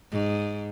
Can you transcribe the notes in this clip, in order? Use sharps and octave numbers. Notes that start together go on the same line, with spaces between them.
G#2